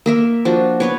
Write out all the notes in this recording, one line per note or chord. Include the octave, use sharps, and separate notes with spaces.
A#3 A#4 E5
F3 D4 F#4
B3 B4 C#5